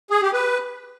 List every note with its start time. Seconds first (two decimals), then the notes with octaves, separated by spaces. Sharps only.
0.10 G#4
0.22 G4
0.33 B4